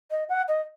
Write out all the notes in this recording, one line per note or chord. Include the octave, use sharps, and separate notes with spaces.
D#5
F#5
D#5